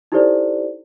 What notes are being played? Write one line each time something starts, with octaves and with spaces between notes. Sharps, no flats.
D#4 E4 G4 A4 C5 D5